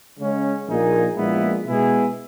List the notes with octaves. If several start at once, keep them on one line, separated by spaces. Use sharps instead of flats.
C#3 G#3 C#4
A#1 A#2 A#3 D#4 G#4
A#1 A#2 G#3 B3 E4
B2 G#3 B3 E4 G#4